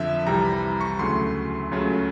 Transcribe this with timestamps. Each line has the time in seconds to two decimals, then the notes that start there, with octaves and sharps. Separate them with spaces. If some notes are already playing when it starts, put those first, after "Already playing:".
Already playing: F2 D3 F3 E5
0.26 C2 C3 E3 G3 A#5
0.45 B5
0.81 C#6
0.99 D2 C#3 F#3 A3 C6
1.71 C#2 C#3 F#3 A3